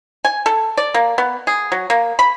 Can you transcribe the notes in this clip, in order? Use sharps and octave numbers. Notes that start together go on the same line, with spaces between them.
G#5
A4
D5
A#3
B3
G#4
F#3
A#3
B5